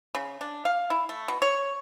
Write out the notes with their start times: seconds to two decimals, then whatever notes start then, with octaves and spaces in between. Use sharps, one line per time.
0.15 C#3
0.41 D4
0.65 F5
0.90 E4
1.09 A3
1.28 B2
1.42 C#5